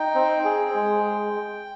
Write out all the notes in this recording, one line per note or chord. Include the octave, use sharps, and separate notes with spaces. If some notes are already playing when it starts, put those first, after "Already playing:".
Already playing: D#4 G5
C4
G#4
G#3